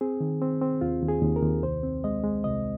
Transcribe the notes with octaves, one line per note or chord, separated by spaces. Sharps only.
C4 G#4
D#3
C4
C4
D#2 F4
D#2
G#4
D#2
A#4
D#2
C2 C5
C4
G#3 D#5
G#3
C2 D#5